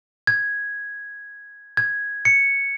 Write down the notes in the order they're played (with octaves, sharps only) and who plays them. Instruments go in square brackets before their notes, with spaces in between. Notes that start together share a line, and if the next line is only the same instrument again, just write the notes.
[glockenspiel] G#6
G#6
C#7